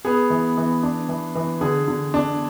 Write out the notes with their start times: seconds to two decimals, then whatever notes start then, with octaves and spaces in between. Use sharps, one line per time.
0.05 B3 G#4
0.30 E3
0.58 E3
0.83 D4
1.09 E3
1.35 E3
1.61 D3 G#4
1.88 D3
2.14 D4